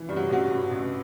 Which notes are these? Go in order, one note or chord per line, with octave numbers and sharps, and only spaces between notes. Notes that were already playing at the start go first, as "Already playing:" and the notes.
Already playing: E3
G2 G3
F#3
A1 F#3
G2
A1